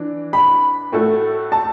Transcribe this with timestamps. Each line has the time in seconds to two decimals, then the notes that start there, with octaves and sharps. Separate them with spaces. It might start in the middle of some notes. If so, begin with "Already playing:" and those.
Already playing: E3 D4
0.33 B5
0.92 A2 A3 F#4 A4
1.52 A5